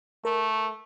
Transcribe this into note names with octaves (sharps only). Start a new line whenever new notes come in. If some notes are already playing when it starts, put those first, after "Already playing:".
A3 A#4